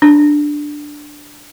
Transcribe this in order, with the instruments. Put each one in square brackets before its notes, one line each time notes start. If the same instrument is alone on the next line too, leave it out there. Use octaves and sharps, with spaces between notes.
[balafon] D4